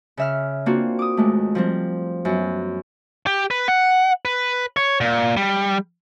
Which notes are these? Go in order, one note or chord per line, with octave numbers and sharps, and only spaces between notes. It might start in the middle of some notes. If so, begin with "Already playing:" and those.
C#3 E5 F6
A#3 C4 D4 F4 F#4
D6 D#6
D#2 G#3 A3
F3 G3 C4
F#2 B3
G4
B4
F#5
B4
C#5
A#2
G3